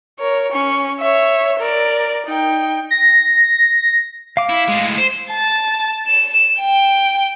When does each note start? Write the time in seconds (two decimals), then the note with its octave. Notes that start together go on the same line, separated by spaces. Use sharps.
0.19 A#4 C#5
0.52 C#4 C#6
1.00 C#5 E5
1.59 A#4 D5
2.26 D#4 G5
2.91 A#6
4.37 F5 D6
4.49 E4
4.68 A2 G#3
4.98 C5
5.31 A5
6.08 E7
6.60 G5